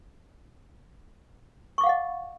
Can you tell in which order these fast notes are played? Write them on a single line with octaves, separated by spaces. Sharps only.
C#6 D6 F5 F#5 D#5